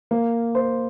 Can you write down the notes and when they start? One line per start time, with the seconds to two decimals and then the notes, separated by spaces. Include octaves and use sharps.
0.11 A#3
0.55 C5